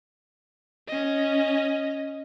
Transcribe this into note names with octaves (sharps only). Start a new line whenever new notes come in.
C#4 D#5